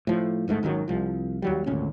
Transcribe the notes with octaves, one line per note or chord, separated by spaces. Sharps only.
A2 F3
G#1 G#2 D#3 A3
G#1 F#2 D#3 F#3
C2 F3
D#2 F#3 G3
G#1 D2 A#2 C#4